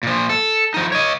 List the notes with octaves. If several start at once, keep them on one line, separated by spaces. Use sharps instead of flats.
A#2 F3
A4
F3 D#4
C#5 D#5